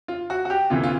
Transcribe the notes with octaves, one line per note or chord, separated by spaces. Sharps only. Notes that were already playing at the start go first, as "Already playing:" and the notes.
F4
F#4
F#4
G4
D2 C3 E3 F4
F4